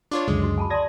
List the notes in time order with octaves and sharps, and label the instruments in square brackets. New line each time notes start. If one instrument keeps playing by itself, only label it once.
[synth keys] D4 F4 C#5 [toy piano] D6
[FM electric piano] C#2 F#2 D3 [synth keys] G#3
[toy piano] F#4
G#5 A5 B5
[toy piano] D5 A5 C6 [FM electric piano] D#6 G#6 A#6